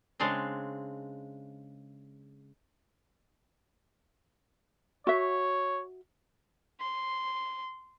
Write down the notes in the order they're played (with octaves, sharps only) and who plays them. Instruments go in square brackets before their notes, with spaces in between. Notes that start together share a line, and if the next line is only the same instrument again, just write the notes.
[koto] C#3 G#3 C4 D4 C5
[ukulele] F#4 E5 [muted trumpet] C#5
[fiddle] C6